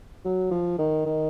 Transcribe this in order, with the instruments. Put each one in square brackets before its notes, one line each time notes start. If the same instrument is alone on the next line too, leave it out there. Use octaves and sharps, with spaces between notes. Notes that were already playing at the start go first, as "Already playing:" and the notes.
[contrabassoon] F#3
F3
D#3
D#3